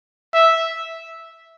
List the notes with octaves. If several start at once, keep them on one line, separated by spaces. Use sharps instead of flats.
E5